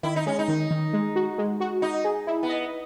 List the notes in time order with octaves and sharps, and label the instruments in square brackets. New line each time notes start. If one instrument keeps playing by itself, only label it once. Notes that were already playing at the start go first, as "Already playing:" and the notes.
[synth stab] D#3 [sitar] E4
[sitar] D#4
[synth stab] G#3 [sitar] C#4
[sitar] D#4
[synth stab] D#3
D#3
G#3
F#4
G#3
F#4
[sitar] D#4 [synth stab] D#5
[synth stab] G#4
E4
[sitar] B3
[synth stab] D#5